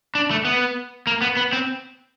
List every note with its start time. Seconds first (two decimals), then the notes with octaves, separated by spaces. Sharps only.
0.15 D4
0.31 A3
0.45 B3
1.07 A#3
1.22 B3
1.37 B3
1.53 C4